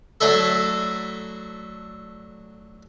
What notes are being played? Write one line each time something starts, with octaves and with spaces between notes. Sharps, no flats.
F#3 A3 D4 E4 A4